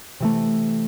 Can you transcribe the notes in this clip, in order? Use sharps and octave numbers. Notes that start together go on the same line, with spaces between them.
C3 E3 A3